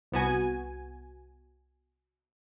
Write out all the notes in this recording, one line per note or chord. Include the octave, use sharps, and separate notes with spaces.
C2 B3 F#4 G#5